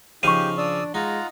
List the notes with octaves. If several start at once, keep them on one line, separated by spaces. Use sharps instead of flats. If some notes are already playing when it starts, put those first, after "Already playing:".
C#3 F3 D#4 G4 F5 C#6 D#7
D4 D5 D#6 E6
G#3 D#4 F4 F#5 A#5